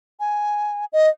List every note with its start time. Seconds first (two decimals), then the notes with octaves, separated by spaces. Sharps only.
0.20 G#5
0.93 D#5